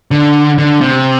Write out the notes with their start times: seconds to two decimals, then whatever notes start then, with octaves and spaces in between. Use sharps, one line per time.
0.11 D3
0.58 D3
0.81 C3